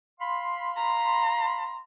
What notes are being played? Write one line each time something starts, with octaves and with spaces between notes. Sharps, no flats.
F5 B5 C6
A#5